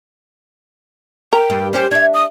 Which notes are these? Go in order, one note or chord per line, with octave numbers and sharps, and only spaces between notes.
A#4 G5
G2
G3 C#4 G4 C5
D4 E5 G#6
D#6